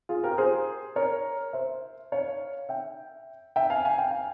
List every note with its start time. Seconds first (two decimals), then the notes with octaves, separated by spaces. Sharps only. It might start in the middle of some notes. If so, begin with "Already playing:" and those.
0.09 F4 G#4
0.24 G4 A#4
0.38 G#4 C5
0.96 A#4 C#5
1.53 C5 E5
2.12 C#5 F5
2.69 E5 G5
3.56 E5 G5
3.70 F5 G#5
3.85 G#5
3.98 G5
4.11 F5